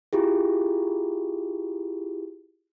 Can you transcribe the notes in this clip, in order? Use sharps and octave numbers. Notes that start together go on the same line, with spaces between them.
E4 F4 G4 G#4